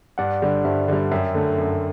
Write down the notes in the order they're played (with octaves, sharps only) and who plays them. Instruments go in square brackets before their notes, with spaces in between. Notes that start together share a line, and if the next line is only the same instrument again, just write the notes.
[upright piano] G2 [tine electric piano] D5 F#5
[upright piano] D3 G3
[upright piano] G2 [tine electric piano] C5 E5
[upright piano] D3 G3
[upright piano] F#2 [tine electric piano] E5 G5
[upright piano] D3 A3
F#2